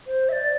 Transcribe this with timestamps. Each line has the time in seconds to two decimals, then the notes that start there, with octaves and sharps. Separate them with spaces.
0.07 C5
0.29 E5
0.32 D5